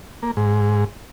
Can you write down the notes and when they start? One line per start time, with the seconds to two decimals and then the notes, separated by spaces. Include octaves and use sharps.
0.23 A#3
0.37 G#2